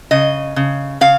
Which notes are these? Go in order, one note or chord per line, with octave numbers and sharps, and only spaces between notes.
C#3 D#5
C#3
C#3 F5